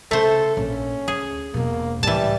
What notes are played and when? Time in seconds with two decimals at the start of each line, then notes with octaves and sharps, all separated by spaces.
0.11 C#3 A3 A4 C5
0.57 A#1 C#4
1.08 D2 G#4
1.54 E1 B2 A#3
2.03 C#2 A2 E3 G3 A5